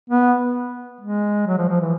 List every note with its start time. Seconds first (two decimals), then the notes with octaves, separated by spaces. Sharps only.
0.10 B3
1.01 G#3
1.47 F#3
1.58 F3
1.69 F3
1.81 E3